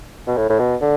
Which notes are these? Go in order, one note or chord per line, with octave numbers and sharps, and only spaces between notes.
B2
A2
A2
B2
D3